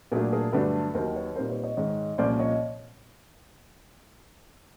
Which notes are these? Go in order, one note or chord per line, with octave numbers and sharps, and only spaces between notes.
A#2 F#3 A3 D4 G#4 A#4
G#4 A#4
G2 D3 F#3 A3 D4 A4 B4
D#2 D#3 F#3 A#4 C5
B4 C#5
A#2 G3 C4 D#4 A#4 C5
B4 C#5
C#5 D#5
G#2 D#3 G#3 C#5 D#5
C2 A#2 F3 A#3 C#4 C5 D5
C#5 D#5